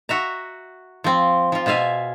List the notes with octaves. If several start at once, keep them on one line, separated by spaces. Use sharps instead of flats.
F#4 E5 A#5
F3 C4
F3 F4
B2 F4 E5 F5 G#5